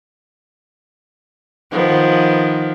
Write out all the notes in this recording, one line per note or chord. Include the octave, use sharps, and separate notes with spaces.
D#3 F3 B3